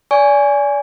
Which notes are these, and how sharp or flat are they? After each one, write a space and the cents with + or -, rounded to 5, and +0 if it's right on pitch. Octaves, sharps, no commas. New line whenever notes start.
D5 -30 G#5 +0 C#6 +20